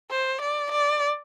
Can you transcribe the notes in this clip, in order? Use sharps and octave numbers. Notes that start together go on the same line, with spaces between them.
C5
D5
D5